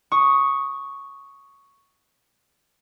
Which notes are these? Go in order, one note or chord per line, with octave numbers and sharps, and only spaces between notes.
C#6 D#6